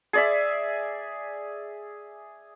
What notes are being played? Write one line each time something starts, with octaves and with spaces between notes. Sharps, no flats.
G#4 D5 E5